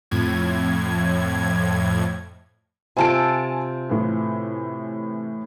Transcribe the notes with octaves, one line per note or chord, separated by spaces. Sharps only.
F2 A2 G#6
C3 F4 A4 G#5 A5 D7
A2 E3